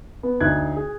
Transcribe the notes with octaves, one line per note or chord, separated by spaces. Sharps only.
B3
D2 D#4 F#6 G#6
G#4